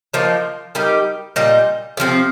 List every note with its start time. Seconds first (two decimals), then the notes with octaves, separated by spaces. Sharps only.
0.13 F3 A#3 D#4 A#4
0.75 G3 D#4 G4 A#4
1.36 A#2 G3 D#4
1.97 C3 F3 C4